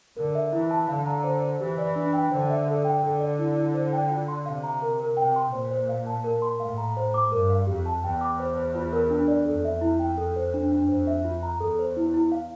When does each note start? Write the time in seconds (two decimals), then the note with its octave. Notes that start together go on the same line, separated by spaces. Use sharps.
0.17 D3 A#4
0.35 E5
0.53 E3 E4
0.71 A5
0.89 D3 F5
1.06 A#5
1.24 C5
1.42 C5
1.60 E3 G4
1.78 D5
1.96 D4
2.13 G5
2.31 D3 C5
2.50 E5
2.68 A4
2.85 G5
3.03 D3 A4
3.20 D5
3.39 E4
3.56 E4
3.74 C5
3.93 G5
4.11 F4
4.28 C6
4.46 C3 F5
4.63 A#5
4.82 A#4
5.00 A#4
5.17 C3 G5
5.36 C6
5.53 A#2 C5
5.71 C5
5.89 F5
6.06 A5
6.24 A#4
6.42 C6
6.60 A2 F5
6.78 A#5
6.97 C5
7.14 D6
7.32 G2 A#4
7.50 F5
7.67 F2 G4
7.86 A5
8.03 E2 G5
8.21 D6
8.40 C5
8.58 C5
8.75 F4
8.93 A#4
9.10 D4
9.28 D5
9.46 F2 A4
9.65 E5
9.81 E4
9.99 G5
10.18 A4
10.36 C5
10.54 D4
10.72 D4
10.89 F2 C5
11.07 E5
11.24 F4
11.43 A#5
11.60 E2 A4
11.79 C5
11.97 E4
12.14 E4
12.32 F5